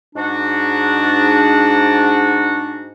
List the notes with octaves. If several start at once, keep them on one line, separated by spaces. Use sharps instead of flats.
G#2 D4 F#4